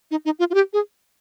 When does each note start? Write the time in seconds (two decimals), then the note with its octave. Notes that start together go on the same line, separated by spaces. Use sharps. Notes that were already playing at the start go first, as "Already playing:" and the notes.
0.11 D#4
0.25 D#4
0.39 F4
0.50 F4
0.54 G4
0.73 G#4